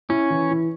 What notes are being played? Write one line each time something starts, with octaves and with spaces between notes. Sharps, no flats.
C#4 E4
E3
E3